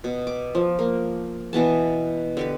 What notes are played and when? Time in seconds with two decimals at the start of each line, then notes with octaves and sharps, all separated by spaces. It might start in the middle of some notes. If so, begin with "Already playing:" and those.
0.04 B2
0.27 D6
0.55 F3
0.79 A#3
1.53 B2 E3 B3 A5
2.37 D3 G4 B4